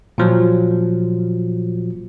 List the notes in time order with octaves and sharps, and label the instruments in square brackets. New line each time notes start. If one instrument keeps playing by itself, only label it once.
[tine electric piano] A#2 F3 F#3